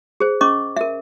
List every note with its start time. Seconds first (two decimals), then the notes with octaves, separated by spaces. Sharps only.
0.20 G#4 C5
0.41 C#4 D#5 C#6 D6
0.76 A#4 E5